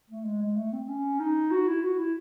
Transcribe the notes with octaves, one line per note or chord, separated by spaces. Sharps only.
A3
G#3
G#3
A3
C4
C#4
D#4
F#4
E4
F#4
E4